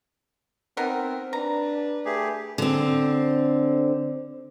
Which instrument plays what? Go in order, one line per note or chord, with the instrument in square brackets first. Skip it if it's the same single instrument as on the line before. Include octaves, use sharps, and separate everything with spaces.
[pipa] B3 D#4 A#4 [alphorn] C4
[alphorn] D4 [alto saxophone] B4 [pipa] A#5
[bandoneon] A3 G4 G#4
[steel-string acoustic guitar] D3 C4